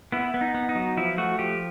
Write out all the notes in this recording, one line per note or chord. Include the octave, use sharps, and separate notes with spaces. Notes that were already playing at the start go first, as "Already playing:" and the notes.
B3 E4
B3
D#4
B3
D#4
F#3
F3 E4
A3 F#4
F3 G4